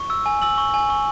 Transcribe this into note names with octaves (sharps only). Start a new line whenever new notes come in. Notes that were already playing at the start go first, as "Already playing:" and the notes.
Already playing: C#6
E6
G#5
E6 F#7
C#6
G#5
C#6